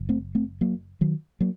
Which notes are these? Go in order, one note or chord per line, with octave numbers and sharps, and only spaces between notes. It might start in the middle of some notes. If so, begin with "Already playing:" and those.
Already playing: F#1
A3 C4
A3 C4
F#3 A#3
D#3 F#3
F#3 A#3